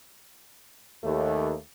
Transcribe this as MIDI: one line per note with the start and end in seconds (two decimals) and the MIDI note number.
1.04 1.53 39
1.04 1.58 57